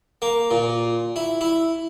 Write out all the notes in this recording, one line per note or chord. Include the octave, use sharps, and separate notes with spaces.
A#3
A#2
E4
E4